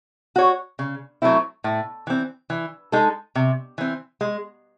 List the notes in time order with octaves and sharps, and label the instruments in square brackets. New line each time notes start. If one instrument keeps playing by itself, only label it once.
[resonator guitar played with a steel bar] F#4 C#5
C#3
F#3 A3 C4 E4
A2
E3 C4
E3
G#3 D#4 A4
C3
E3 C4
G#3